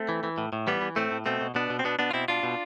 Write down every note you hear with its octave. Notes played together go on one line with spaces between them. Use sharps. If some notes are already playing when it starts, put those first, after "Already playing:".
Already playing: A3 C4
E3
E3
A2
A2
E3 G3 B3
E3
A2 A3 C4
A2
B2 A3 C4
B2
B2 B3 D4
B2
C4
B2 B3 D4
B2 B3 D4
F4
B2 C4 E4
B2 D4 F4
B2